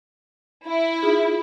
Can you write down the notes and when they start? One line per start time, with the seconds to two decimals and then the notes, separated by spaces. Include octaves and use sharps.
0.65 E4
1.03 D#4 F4 G#4